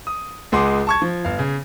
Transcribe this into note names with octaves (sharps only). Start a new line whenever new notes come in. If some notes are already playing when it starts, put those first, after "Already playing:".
D#6
C#2 G#3 G#4 F#5 C6 D6
A5 C#6 G#6
F3
G1 F5
C#3